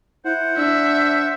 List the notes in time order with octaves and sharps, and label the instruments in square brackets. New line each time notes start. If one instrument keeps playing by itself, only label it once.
[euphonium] E4 [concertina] C5 F#5
[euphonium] D4 [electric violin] E5